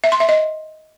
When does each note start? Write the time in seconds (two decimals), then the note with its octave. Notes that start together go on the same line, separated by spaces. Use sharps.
0.04 E5
0.12 C6
0.20 E5
0.29 D#5